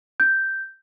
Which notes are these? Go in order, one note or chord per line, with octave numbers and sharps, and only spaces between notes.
G6